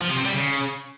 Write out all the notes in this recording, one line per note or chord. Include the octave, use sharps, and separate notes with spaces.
F3
C3
C4
G3
C#3